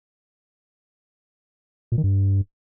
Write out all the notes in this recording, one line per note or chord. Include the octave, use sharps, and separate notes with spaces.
A#2
D#3
G2